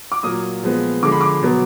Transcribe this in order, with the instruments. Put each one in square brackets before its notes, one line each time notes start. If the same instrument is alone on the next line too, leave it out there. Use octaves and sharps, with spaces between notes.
[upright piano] D6
A#2 F#3 A#3 D#6
A#2 F3 G#3 B3
D3 F3 G#3 D6
B5
D6
B2 F#3 B3